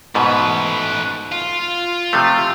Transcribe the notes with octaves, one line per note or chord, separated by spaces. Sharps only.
G#2 B2 A3 B4
F4
C3 F3 A3